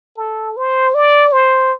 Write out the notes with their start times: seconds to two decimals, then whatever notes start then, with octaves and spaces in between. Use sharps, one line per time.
0.17 A4
0.57 C5
0.94 D5
1.32 C5